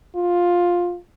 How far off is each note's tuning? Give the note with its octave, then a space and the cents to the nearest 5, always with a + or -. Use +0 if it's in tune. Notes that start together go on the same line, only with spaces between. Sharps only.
F4 +10